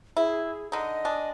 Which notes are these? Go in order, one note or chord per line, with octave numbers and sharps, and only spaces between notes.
E4 G#4
D3 D#4 D#5
G#3 D4